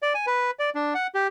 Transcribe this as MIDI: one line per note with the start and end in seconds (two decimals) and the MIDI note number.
0.03 0.13 74
0.15 0.26 80
0.27 0.51 71
0.59 0.70 74
0.75 0.94 62
0.95 1.07 78
1.15 1.27 67